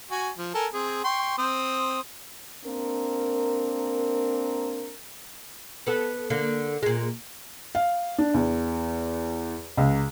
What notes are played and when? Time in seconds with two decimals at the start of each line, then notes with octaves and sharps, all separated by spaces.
0.11 F#4 G#5
0.38 F3
0.55 A4 A#4 G#5
0.74 C4 G#4
1.04 G5 C6 C#6
1.38 C4 C5 D#6
2.65 A#3 C4 D4 A#4
5.87 B3 A4
6.30 D3 A#3
6.83 A#2 G#3
7.75 F5
8.18 D4
8.34 E2
9.77 C#2